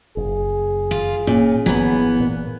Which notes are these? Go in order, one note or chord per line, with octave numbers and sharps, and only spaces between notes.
F#1 G#4
F4
A#2 C#4
G1 D#2 E3 F#3 B3
A#2